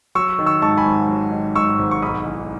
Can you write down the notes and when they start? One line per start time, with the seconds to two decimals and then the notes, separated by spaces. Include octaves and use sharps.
0.15 F#3 C#6 E6
0.39 D#3
0.46 C#6 E6
0.62 G#2 A5 C#6
0.77 G#5 B5
0.86 G#1
1.09 F#3
1.32 D#3
1.55 G#2 C#6 E6
1.79 G#1
1.91 C#6
2.02 B1 B5 D#6
2.25 E3